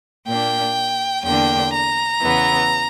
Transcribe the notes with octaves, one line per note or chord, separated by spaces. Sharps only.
A#2 A#3 D4 G5
E2 D3 A#3 D4 G5
A#5
E2 C#3 E3 B3